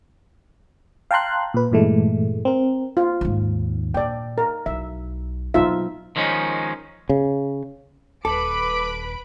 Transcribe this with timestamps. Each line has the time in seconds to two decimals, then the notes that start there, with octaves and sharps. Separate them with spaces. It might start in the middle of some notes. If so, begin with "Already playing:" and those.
1.11 F5 G5 A5 A#5 C6 F#6
1.54 A#2 B4
1.71 G2 A#2 E3 G#3 A3
2.45 C4 A#4
2.97 F4
3.21 D#2 G#2
3.94 A#2 D5 G5
4.38 A#4
4.66 B1 E5
5.54 B2 F#3 D#4 F4 E5
6.16 D#3 F3 G#3 C#4 D#4
7.09 C#3
8.25 D#1 A4 B4 B5 D6 D7